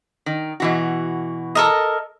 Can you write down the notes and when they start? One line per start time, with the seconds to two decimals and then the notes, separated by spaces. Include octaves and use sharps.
0.26 D#3
0.60 B2 E3 F#4
1.55 A4 A#4 D#5